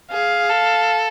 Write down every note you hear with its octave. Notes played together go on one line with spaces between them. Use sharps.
G#4 F5
A4